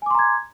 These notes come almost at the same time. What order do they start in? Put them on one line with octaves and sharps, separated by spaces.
G#5 D6 C6 A#5 G#6